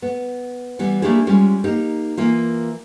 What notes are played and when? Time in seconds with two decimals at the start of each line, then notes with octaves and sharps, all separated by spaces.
0.02 B3
0.79 E3 G3 B3
1.02 A3 A#3 D4 E4 G4 G#4
1.27 G3 G#3 C#4 F4
1.64 A#3 D#4 G4
2.17 E3 A#3 F4